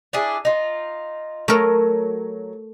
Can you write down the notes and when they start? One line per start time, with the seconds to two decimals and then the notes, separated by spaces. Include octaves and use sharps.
0.13 D4 E4 G#4
0.45 D#4 F4
1.48 F#3 A3 A#4